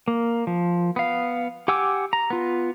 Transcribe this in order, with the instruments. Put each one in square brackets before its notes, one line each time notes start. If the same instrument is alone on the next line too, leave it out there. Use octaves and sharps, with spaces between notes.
[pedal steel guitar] A#3
F3
B3 F5
G4 F#5 G#5 D6 E6
A#5
B3 F4